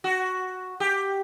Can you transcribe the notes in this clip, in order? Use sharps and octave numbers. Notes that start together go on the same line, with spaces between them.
F#4
G4